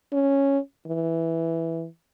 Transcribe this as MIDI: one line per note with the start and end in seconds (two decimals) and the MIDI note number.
0.13 0.58 61
0.87 1.86 52